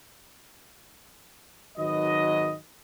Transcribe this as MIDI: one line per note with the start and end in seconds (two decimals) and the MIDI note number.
1.78 2.54 32
1.78 2.54 51
1.78 2.54 54
1.78 2.54 71
1.78 2.54 75